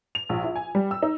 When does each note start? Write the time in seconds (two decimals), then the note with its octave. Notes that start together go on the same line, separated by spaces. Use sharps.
0.15 F7
0.29 A#1
0.44 E4
0.56 G#5
0.75 G3
0.91 E6
1.02 D#4